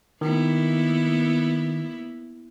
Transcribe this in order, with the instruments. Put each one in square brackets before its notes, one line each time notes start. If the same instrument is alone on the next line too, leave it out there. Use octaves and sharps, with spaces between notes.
[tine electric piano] D#3 [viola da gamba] A#3 B3 E4